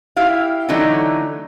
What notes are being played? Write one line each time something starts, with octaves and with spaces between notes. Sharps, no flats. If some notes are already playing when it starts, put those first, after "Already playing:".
E4 G4 F5
D3 E3 F#3 A3 D#4